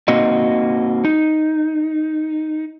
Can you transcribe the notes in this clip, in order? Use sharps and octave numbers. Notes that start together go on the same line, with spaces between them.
A#3 C4 D#4 F#4 D#5
D#4